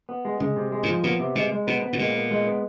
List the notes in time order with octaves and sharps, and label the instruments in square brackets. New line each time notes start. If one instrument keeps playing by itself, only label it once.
[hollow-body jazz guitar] B3
G#3
[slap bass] C#3 [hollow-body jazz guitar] G#3
[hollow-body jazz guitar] C3
G#3
[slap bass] G#2
[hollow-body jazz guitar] F3
[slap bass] A#2 [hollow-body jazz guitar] B3
[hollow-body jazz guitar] C3
[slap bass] B2 [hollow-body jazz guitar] G#3
[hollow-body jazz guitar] G#3
[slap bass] B2 [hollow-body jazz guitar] B3
[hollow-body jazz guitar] B3
[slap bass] A2
[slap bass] A#2 [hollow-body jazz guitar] G#3
[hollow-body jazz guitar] B3
G#3
B3